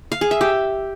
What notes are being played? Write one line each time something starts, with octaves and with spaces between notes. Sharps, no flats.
F5
G#4
E5
G4